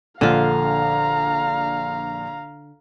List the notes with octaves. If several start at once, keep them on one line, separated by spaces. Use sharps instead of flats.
A#1 D3 F4 F5 A#5